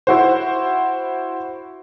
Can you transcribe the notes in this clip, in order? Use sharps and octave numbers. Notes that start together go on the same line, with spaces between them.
E4 F#4 C5